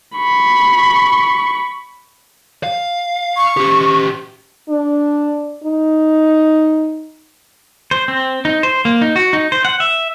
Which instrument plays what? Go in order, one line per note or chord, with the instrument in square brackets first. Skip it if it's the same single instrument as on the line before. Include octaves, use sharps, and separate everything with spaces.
[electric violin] B5 C#6
[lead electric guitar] F5
[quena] C#6
[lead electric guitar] C#4 G4
[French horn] D4
D#4
[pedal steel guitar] C5
C4
D#4
C5
A#3
D#4
F#4
D#4
C5
F#5
E5